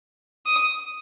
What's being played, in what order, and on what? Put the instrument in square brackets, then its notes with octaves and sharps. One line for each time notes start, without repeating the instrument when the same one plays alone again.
[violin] D#6